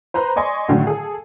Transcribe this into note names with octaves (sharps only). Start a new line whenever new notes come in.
B4 C5 A#5 B5
D5 D#5 G#5 C6 C#6
A2 D3 D#3 F#3 A3
G#4 A4